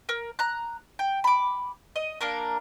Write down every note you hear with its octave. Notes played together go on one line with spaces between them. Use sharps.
A#4
A#5 F#6
G5
B5 D6
D#5
A#3 D4 A#4